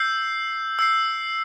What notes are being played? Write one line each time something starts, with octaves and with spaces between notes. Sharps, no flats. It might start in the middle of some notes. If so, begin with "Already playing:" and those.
Already playing: E6 G6 C7
E6 G6 C7